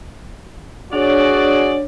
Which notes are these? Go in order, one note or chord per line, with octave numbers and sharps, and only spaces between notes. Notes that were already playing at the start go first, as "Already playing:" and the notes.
D4 F#4 G#4 C#5 D5